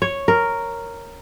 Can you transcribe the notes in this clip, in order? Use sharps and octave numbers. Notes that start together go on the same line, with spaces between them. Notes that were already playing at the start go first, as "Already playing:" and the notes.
C#5
A#4